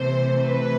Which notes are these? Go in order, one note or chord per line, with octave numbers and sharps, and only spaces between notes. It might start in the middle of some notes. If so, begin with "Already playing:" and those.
Already playing: C3 E3 A3 C5
B4